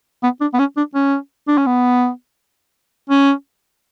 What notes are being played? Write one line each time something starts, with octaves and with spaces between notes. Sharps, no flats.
B3
D4
B3
C#4
D4
C#4
D4
C#4
B3
C#4